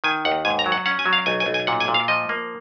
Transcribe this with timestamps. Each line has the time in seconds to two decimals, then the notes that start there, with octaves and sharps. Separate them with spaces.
0.04 D#3 G#5
0.25 D#2 F#5
0.45 G#2 G#5
0.59 A#5
0.66 F#3
0.72 F#5
0.86 C#4 F#5
0.99 G#5
1.06 F#3
1.13 F5
1.26 B1 G#5
1.40 G#5
1.46 B1
1.54 G#5
1.67 A#2 F#5
1.80 G#5
1.88 A#2
1.94 F5
2.08 F3 D#5
2.29 A#3